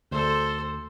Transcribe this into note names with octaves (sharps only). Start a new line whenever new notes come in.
D2 A4 C5